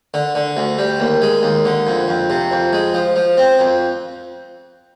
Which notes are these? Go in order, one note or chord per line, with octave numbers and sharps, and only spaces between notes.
D3
D3
D2
G3
D#2
G#3
D#2
D3
F2
F2
C3
F2
G#3
F3
F3
C4
F2